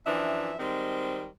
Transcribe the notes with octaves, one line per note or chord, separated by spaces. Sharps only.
F#2 E3 F3 D4 E5
D#3 G3 G#3 C4